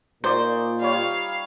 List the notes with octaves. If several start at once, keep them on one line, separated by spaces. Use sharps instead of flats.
A#2 D#4 C5 D5 C#6
G3 F4 C#5 F5